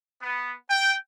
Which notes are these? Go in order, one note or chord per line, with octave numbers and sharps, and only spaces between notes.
B3
G5